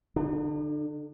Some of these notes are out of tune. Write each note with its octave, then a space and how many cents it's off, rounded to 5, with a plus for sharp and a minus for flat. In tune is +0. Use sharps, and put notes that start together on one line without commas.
D3 +0 D4 +45